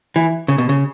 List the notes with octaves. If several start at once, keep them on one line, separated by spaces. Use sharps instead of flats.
E3
C#3
B2
C#3